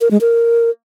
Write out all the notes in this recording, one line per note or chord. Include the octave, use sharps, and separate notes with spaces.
A#4
G#3
A#4